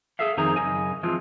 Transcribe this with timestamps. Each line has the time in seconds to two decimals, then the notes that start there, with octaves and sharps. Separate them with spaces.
0.19 G#4 A4 E5 F5
0.37 F2 D#3 D#4 G#4 C5 A#5
0.56 F#2 C#3 D#5 G#5
1.03 E3 F3 G#3 C4 F4